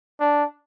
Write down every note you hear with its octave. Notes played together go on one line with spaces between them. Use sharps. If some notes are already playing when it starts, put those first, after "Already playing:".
D4